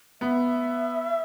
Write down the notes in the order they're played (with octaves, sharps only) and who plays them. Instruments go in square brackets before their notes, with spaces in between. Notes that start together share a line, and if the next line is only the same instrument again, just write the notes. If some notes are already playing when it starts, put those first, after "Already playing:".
[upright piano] B3 [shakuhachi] E5